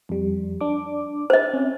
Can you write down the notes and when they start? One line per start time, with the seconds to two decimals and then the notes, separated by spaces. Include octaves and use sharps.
0.09 F2 G3
0.61 D4 D6
1.30 C5 D#5
1.53 C4 C#4